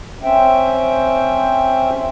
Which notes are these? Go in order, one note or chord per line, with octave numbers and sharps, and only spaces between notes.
C4 C#4 C5 E5 G5